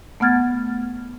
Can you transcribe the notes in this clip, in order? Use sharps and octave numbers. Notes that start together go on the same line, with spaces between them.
A3 B3 F#5 F6 G#6 A6